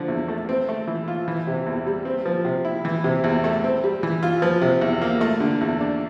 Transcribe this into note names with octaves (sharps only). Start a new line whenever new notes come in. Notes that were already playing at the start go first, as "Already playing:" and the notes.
Already playing: D3 F3
E2
A3
C4
A3
E3
F4
E3
C3
E2
G3
C4
F3
C3
E4
E3
C3
E2
A3
C4
G3
E3
F4
F3
C3
E2
A#3
A3
D3
E2
D4